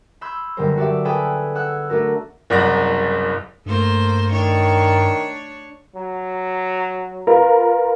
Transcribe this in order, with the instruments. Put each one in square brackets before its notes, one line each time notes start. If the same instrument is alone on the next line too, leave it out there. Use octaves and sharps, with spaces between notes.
[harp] B5 C6 E6 G6 G#6
F#1 D3 G3 B3 A#4 C5
F#4 G4 D5 E5
G#4 A4 B4 G5 B5 G#6
F#5 E6 F#6 G#6
A3 D4 F#4 A#4
[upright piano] F#1 C2 D5 F#5 A#6
[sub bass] G2 [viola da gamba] A3 A#3 C5
[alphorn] D#3 [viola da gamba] D4 C#5
[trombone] F#3
[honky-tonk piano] F4 A#4 B4